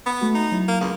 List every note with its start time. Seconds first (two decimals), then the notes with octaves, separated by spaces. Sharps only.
0.06 B3
0.21 A3 F#4
0.35 D#4
0.52 F#3 E4
0.68 A#3
0.81 C#2 F5